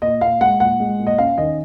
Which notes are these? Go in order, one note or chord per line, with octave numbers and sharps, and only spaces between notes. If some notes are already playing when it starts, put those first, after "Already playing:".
A#2 D#5
A#2 F5
G#3 F#5
A#2 F#5
G#3
A#2
D#5
C#4 F5
D#3 D#5